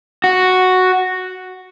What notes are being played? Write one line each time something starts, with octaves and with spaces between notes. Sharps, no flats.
F#4